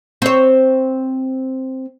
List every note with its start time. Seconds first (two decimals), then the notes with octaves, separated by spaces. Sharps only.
0.22 C4 C#5